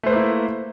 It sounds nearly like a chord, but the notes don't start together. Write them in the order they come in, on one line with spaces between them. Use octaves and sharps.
A3 C5 B4 A#3 E4